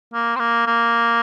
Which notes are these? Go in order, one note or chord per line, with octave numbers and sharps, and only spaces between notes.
A#3
C4
A#3
A#3